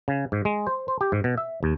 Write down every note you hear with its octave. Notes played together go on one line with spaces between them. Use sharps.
C#3
G#2
G#3
C5
C5
G4
G#2
B2
E5
D#2